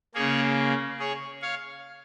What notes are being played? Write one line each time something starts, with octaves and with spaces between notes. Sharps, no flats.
C#3 A#3 G#4 C#5
G#4 C#5
C#5 F5